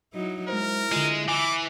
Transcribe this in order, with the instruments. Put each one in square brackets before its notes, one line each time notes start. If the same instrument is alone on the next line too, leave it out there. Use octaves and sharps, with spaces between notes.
[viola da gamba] F#3 D#4 E4
[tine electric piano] G#3 C5 [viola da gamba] E4 [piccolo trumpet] A#4
[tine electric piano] D3 F4 [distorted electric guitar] G#3
[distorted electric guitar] E3 [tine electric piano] G#5 [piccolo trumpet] D6